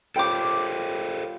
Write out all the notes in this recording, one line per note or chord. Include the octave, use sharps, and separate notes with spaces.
G3 F4 G4 A4 C5 C#5 G5 D6